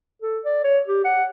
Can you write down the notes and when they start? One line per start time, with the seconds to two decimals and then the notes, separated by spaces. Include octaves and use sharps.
0.22 A4
0.45 D5
0.64 C#5
0.88 G4
1.05 F#5